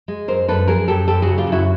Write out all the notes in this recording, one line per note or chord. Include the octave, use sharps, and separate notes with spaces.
G#3
F#2 A#4 C5
F#2 A4 B4
F3 G#4 A#4
F#2 G4 A4
F#2 G4 A4
C#3 F#4 G#4
F4 G4
F#2
E4 F#4